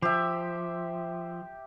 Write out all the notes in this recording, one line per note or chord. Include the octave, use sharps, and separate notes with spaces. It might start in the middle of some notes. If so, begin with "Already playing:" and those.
F3 G4 E5